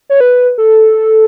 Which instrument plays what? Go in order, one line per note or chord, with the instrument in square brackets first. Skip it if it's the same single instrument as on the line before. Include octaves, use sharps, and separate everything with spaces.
[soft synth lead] C#5
B4
A4